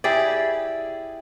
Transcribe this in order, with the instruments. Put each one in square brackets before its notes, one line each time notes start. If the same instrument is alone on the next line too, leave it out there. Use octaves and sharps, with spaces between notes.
[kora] E4 G4 G#4 D5